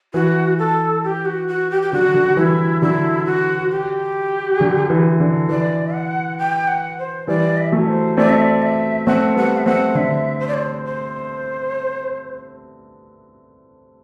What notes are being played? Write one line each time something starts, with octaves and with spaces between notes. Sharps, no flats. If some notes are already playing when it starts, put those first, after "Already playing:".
E3 F#4
A4
G4
F#4
F#4
G4
G4
D3 F#3 F#4
D3 F#3
E3 G3 E4
D3 F#3 E4
F#4
G4
D3 F#3
E3
D3
E3 D5
F#5
G5
F#5
C5
E3 G3 D5
E5
F#3 A3
C5
A3 C4 D5
E5
D5
E5
A3 C4 F#5
G3 B3 F#5
E5
A3 C4 F#5
D3 E5
C5
D5
C5
C5